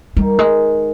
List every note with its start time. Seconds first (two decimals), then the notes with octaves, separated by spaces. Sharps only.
0.17 D#3 G3
0.39 G#3